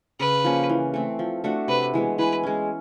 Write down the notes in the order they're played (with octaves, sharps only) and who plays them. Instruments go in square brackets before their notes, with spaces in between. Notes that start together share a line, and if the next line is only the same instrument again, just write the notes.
[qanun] C#3 [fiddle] B4
[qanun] F3 A#3 C#4
E3
A3 C4
F3
A3 D4 F#4
[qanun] C3 [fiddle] B4
[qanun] E3 G#3 B3
[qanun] E3 [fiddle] B4
[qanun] G#3 C#4